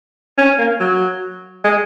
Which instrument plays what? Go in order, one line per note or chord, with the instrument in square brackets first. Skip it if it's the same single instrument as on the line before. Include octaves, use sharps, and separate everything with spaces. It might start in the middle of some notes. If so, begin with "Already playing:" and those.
[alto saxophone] C#4
A#3
F#3
G#3